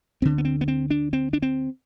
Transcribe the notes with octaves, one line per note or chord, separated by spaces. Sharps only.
D2 D3 C4
B3
C4
B3
C4
D4
C4
D4
C4